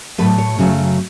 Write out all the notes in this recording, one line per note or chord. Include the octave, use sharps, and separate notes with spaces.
A2 F#3 A3 B4
C#5
F#2 C#3 F#3 A3 C#4